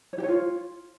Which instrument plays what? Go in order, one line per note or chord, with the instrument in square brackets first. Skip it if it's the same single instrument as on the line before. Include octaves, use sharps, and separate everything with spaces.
[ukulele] C#5
G4
C#5
F4